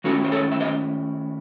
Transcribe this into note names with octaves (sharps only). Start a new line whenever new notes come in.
D#3 A3 C#4 E4 F#4 A4
C5
A4 C#5
E5
C5 D#5